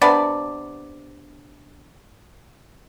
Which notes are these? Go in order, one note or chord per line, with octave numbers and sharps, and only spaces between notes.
C3 B3 D4 D5